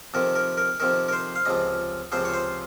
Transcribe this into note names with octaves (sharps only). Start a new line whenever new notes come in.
F2 C3 D#3 A#4
A#4
A#4
F2 C3 D#3 A#4
A#4
C5
F5
C#2 C3 F3 D#5
C#2 C3 F3 C5
C#5
C5